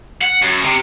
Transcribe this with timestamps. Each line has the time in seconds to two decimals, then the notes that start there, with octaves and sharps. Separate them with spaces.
0.22 F#5
0.42 F#2
0.64 C3